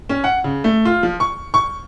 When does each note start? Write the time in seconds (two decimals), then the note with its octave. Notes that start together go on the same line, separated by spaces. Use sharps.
0.09 C#4
0.24 F#5
0.44 C#3
0.64 A3
0.85 F4
1.03 F3
1.20 C#6
1.54 C#6